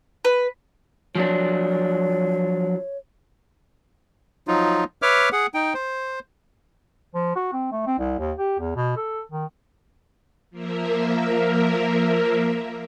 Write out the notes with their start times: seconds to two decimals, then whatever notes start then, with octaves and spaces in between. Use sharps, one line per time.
0.25 B4
1.15 F3 F#3 D4 C#5
4.48 F3 F#3 D#4 F4
5.02 B4 C#5 E5 D6 F6
5.32 G#4 F#5
5.54 D#4 G5
5.74 C5
7.15 F3
7.36 F#4
7.53 C4
7.72 A3
7.87 C4
7.99 C2
8.19 D#2
8.38 G4
8.59 E2
8.76 B2
8.97 A4
9.32 D#3
10.51 F3 A#3 A#4 E5